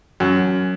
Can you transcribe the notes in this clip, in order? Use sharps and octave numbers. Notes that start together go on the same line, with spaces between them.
F#2